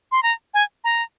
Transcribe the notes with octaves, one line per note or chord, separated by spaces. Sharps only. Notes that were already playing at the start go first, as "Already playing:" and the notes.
C6
A#5
G#5
A#5